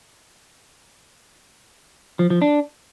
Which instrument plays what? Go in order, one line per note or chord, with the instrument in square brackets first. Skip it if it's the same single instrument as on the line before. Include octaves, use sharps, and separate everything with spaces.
[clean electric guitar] F3
F3
D4